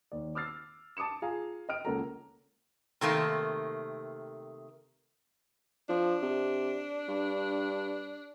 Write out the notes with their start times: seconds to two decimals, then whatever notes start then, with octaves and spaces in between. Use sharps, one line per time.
0.12 D#2 D5
0.35 D6 E6 F6 A6 C7
0.97 A5 D6 D#6 C#7 E7
1.22 F4 G#4 F5 G#5 A#5
1.69 D#5 G5 F6 D7
1.85 C#2 A#3 C#4 A4 F#5 A#5
3.01 C3 D#3 A3 A#3
5.89 F3 D4
6.22 C3
7.08 G2